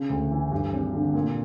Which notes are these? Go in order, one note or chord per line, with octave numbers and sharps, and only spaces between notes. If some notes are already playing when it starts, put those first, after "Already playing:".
Already playing: C#3
D2
E3
G2
G#1
D3
A#2